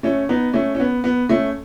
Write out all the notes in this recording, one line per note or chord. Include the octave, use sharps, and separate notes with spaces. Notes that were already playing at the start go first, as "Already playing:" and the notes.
A3 C#4
B3 D#4
A3 C#4
C#4
B3
B3
A3 C#4